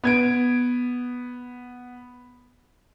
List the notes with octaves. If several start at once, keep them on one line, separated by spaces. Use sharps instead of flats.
B3 G#6 D7